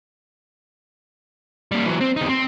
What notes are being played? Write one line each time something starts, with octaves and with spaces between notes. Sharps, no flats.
G3 A#3
E3 F#3
C4
E2 D#4
C4